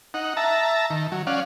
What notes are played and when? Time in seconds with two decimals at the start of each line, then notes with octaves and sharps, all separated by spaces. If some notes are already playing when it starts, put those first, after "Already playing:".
0.14 D#4 F#5
0.37 E5 A5 A#5
0.90 D#3
1.12 F#3
1.27 C#4 D5 F5 F#5